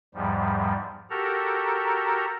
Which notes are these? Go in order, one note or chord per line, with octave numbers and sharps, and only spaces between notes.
E2 G#2 F3 G3
F#4 G4 A4 A#4 A#5